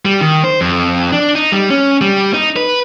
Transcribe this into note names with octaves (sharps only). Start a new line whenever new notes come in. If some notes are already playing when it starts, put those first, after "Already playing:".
G3
D#3
C5
F2
D4
D#4
G3
C#4
G3
D#4
B4